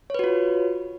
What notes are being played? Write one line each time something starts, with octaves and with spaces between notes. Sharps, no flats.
F4 F#4 B4 C#5